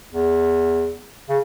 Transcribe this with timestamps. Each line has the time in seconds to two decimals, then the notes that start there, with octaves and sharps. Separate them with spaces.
0.13 E2
1.29 C#3